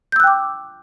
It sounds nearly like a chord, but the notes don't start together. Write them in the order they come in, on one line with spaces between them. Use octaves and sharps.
G6 E6 F#6 G5 D6